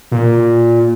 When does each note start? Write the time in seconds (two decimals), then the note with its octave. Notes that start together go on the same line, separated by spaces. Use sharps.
0.12 A#2